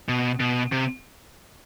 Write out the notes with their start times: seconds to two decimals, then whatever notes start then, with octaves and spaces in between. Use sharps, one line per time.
0.08 B2
0.40 B2
0.72 C3